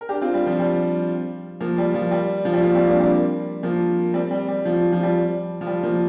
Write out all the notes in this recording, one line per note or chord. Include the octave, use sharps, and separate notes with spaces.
A#4
D4 G4
C4 F4
G3
F3
G3
F3 A#3
G3
F3
G3
F3
G3
F3 A#3
G3 C4
A#3 D4
G3
F3 A#3
G3 C4
G3
G3
F3
F3
G3
F3
G3
F3 A#3